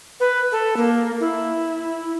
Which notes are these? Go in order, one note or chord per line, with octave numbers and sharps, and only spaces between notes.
B4
A4
A#3
E4